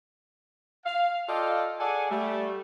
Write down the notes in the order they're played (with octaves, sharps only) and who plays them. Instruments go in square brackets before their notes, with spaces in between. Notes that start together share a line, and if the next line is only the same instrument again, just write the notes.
[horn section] F5
F4 A4 D5 D#5 F5 G5
G#4 A4 D5 F#5 G#5
G3 A3